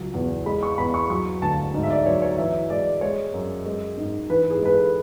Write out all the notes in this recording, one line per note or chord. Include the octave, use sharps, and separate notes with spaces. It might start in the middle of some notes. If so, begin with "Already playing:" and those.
Already playing: C#2 F#3
E2
G#3 B5
C#6
E2 B5
C#6
F#3 C#6
D2 A5
G#2
E5
D5
F#3 C#5
C#5
E3 E5
G#3 D5
G#3 C#5
F#2
G#3
G#2
E3 B4
G#4
G#3 B4
A4